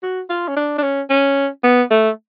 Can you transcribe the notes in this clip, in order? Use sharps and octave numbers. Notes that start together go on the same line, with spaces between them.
F#4
F4
C#4
D4
D4
C#4
C#4
B3
A3